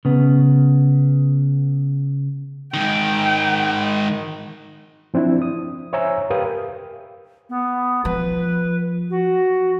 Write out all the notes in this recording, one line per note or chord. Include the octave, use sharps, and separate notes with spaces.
C#3 B3
G#2 D#3 G5
F3 C4 D4 E4
D#6
C5 C#5 E5 G#5 A#5 E6
G4 A#4 B4 F5 G5 D#6
B3
F3 B4
F#4